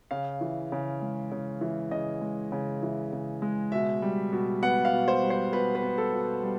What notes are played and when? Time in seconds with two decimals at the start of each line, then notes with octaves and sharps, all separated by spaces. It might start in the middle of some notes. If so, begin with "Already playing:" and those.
0.11 C#3 F5
0.41 E3
0.72 C#3
1.02 G#3
1.32 C#3
1.61 E3
1.91 C#3 D#5
2.21 G#3
2.52 C#3
2.83 E3
3.12 C#3
3.42 G#3
3.72 B2 E5
4.02 G3
4.32 B2
4.62 B3 F#5
4.85 F5
4.93 B2
5.08 C5
5.23 G3
5.30 C5
5.53 B2 B4
5.75 B4
5.83 B3
5.98 A4
6.13 B2
6.43 G3